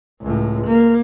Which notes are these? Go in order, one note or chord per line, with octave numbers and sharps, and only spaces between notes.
C#2 A2
A#3